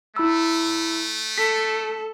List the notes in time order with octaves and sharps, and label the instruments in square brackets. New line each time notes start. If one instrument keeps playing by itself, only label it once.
[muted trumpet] A3 [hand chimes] E4 B5 E6
[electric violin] A4 [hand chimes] B6